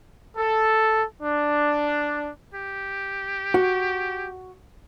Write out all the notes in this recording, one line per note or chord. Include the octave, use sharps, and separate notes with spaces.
A4
D4
G4
F#4